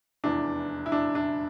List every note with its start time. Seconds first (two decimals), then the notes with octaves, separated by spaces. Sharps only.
0.24 F1 E2 E3 D4
0.86 E4
0.92 D4
1.15 D4